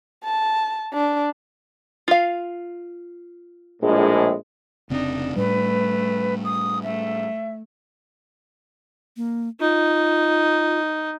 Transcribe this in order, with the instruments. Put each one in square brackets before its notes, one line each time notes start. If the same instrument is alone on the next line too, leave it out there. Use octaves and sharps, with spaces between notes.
[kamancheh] A5
D4
[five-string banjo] F4 F5
[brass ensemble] A#1 A2 G#3
[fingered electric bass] F1 C#3 C4 [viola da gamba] D4 D#4
[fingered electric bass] A2 G3 [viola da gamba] A3 [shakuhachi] B4
[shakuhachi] D#6
[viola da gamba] A3 [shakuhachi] E5
[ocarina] A#3
[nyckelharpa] D#4 [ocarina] F4